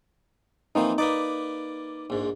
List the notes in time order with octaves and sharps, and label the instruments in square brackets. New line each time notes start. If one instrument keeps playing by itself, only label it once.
[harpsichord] E3 F3 C5 [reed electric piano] A#3 C4 D#4
[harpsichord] A#3 B4 D5 [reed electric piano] D#4
[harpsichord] A#1 G#2